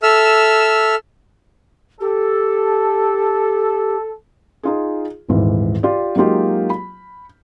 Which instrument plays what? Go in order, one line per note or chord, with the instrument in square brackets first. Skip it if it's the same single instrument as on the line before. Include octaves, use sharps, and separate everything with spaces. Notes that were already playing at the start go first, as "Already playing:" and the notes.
[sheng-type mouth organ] A4 E5 E6 F6
[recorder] G4 [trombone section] A4
[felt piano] D#4 F4 G#4
D#1 G#1 G#2 E3
F4 G4 D5
F#3 G#3 A#3 D#4 F4 G4
B5